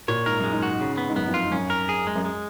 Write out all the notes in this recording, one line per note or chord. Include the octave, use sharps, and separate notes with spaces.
A#2 C#5
G#2 A#4
F#2 G#3
G#2
F#4
C#3
B3
G#2
F#2 B3
F2
F4
G#2
F#2 C#4
A#4
G#4
G#3
F#2
G#3